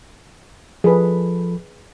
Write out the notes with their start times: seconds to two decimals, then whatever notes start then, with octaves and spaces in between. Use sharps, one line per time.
0.84 F3 G#4 A4 B4 B5